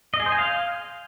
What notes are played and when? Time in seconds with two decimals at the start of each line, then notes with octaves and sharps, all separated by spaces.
0.14 D#5
0.20 G#4
0.26 C5
0.32 G#5
0.38 F5